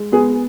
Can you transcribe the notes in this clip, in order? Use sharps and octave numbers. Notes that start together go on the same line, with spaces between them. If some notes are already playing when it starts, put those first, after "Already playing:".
Already playing: G#3
B3 G#4